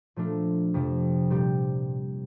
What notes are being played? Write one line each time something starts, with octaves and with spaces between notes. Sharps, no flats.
A#2 F3 A3 D4 F4
F2 C3 F3
A#2 G3 C4 G4